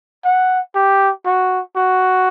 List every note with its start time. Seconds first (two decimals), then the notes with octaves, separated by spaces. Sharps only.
0.24 F#5
0.75 G4
1.25 F#4
1.76 F#4